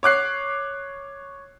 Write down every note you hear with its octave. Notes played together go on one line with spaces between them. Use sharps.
C#5 D6 F#6 C7